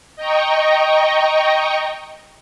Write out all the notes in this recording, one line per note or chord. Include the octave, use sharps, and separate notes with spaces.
D#5 G5 A#5 C#6